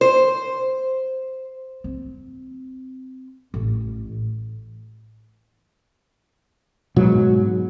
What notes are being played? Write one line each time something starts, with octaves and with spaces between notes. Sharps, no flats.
C5
C4
A1
G#2 B2 F#3